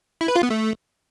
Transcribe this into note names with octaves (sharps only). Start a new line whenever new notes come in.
E4
B4
F4
B3
A3